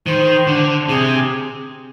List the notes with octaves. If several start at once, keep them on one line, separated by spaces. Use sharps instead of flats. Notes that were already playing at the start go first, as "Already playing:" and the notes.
D#3 C5
D3
C3 G#4